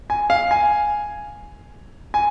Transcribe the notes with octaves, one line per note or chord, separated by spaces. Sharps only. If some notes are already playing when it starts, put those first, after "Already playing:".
G#5
F5
G#5
G#5